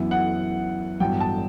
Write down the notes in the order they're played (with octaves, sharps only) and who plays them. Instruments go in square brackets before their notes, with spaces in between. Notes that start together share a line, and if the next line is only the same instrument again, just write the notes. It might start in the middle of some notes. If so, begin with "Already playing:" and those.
Already playing: [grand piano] F#2 E3 B3 E4
[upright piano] F#5
[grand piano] A1 G2 F#3 B3 [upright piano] G5
[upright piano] A5